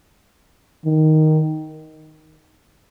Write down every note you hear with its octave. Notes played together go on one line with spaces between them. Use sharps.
D#3